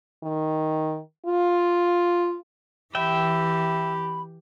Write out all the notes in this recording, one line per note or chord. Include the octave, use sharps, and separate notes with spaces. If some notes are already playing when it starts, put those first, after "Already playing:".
D#3
F4
E3 G4 E5 G5 B5